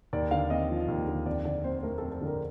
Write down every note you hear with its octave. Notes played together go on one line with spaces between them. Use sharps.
D#2 D5
D3 F5
C4 D#5
F3
D#2
D3
F2 D5
D3 D5
C4 C5
C5
A3 A#4
F2 A4
A4
D3 A#4